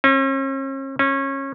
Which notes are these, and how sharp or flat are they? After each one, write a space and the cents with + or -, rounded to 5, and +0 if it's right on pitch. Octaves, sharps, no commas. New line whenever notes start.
C#4 -45
C#4 -25